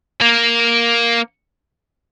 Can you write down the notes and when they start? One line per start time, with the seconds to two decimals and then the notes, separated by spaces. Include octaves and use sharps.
0.22 A#3